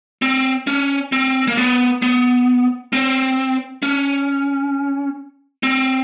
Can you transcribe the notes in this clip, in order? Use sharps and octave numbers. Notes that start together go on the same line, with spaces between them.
C4
C#4
C4
A#3
B3
B3
C4
C#4
C4